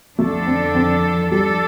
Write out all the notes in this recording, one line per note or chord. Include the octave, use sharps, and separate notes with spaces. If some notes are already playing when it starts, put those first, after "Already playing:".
F2 D3 F3 A3 D4 A4
C4
C4
F3 G3 D4 A4